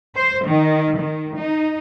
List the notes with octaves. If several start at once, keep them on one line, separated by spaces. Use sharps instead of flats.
C5
D#3
D#3
D#4